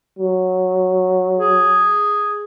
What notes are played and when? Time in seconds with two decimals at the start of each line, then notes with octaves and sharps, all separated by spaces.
0.19 F#3
1.37 G#4